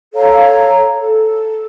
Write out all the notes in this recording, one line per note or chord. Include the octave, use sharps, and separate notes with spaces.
A4 C#5 F5 A#5
A4